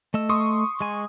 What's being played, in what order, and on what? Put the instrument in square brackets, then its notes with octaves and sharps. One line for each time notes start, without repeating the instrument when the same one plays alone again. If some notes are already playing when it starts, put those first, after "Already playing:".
[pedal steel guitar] A3 D#5 E6
[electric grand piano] C6 C#6 D#6
[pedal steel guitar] G#3 G#5